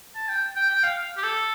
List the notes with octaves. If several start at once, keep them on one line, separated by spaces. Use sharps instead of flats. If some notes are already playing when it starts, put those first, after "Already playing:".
A5
G5
G5
G5
F5
G4
A4